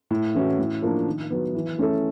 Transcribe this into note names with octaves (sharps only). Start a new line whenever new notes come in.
A2
E3 A3 C#4 F#4
A2
F3 A#3 D4
D#3
F#3 B3
E3
A3 C#4 E4 A4